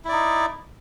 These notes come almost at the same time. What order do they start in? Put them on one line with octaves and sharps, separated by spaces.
E4 D5 D#4